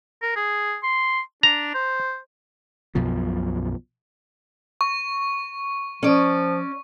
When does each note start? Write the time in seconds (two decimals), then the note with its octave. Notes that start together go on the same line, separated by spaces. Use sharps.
0.22 A#4
0.36 G#4
0.83 C6
1.43 D4 A#5
1.74 C5
2.95 B1 F#2 B2 F3
4.81 C#6
6.03 F3 C#4 D5